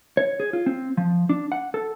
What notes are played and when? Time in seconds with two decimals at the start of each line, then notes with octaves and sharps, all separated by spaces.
0.17 C#5
0.40 G#4
0.53 F4
0.66 C4
0.97 F3
1.29 D4
1.52 F#5
1.74 A4